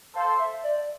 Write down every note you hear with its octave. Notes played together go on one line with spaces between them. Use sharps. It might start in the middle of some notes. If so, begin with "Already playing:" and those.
A4 C5 F5
E5
D5